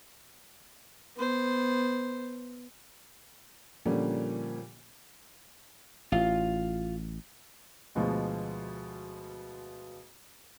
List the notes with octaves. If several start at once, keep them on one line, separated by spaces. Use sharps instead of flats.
B3 C5
A#2 D3 F3 G3 A#3 C#4
A1 F4 F5
D2 B2 F3 G#3